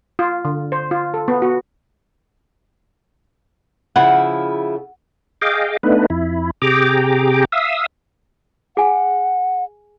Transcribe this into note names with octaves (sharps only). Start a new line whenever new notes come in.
F4
D3
C5
F4
A4
B3
F#4
C#3 F3 E4 F#5
G#4 D#5 F5 G5 D6
A3 B3 D4 D#4 B4
F2 E4
C3 G4 G#4 G5 A#5 D6
E5 F5 D#6 E6
G#4 F#5 G#5